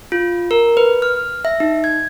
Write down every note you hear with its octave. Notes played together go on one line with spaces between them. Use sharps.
F4
A#4
B4
F6
E5
D#4
G#6